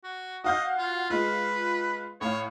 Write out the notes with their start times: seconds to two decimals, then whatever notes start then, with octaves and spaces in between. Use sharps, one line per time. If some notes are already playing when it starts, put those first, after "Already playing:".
0.04 F#4
0.44 F#4 D#5 F5 G6
0.78 F4
1.10 G#3 F4 B4
2.21 A2 C#5 F5